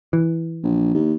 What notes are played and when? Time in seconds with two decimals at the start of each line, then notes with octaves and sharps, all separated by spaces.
0.13 E3
0.63 A#1
0.94 D#2